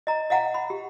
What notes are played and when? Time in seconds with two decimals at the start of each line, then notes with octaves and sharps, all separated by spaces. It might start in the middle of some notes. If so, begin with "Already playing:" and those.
0.07 D#5 A#5
0.30 D#5 F5 F#5 A#5
0.54 B5
0.70 G4